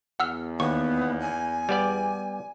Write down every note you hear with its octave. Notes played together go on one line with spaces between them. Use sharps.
E2 F#5 E6 F6
D#2 B3 C#6
G#5
G3 B3 D5